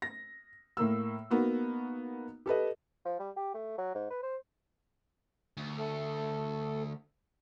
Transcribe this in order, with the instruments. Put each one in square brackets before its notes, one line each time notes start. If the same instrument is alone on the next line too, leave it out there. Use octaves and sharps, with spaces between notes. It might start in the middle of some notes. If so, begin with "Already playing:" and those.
[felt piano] A#6
A2 A#3 E6
A#3 B3 D#4 F#4
G4 A4 B4 D#5
[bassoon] F3
G3
G4
A3
F#3
G#2
B4
C5
[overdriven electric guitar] D2
[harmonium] A3 A4